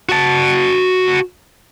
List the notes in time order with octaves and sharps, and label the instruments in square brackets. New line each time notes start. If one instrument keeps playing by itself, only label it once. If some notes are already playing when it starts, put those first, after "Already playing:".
[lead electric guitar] F#4 A5